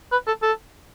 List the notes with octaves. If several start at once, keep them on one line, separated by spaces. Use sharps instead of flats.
B4
A4
A4